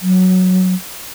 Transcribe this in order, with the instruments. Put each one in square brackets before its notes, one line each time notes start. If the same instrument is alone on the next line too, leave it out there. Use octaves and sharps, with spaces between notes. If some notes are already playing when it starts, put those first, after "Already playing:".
[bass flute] F#3